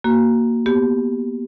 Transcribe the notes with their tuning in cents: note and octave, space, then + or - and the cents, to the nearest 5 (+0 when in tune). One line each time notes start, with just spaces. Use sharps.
A#3 +0 F#4 +10
B3 +0 G4 +0